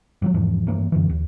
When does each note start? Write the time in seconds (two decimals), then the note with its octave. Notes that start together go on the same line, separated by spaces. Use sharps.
0.22 G2 F3 F#3
0.34 E2 G#2 E3 F3
0.68 G2 E3 A3 A#3
0.92 F#2 D3 E3
1.10 D#2